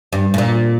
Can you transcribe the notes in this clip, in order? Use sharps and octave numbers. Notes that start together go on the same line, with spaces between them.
G2
A2
A#2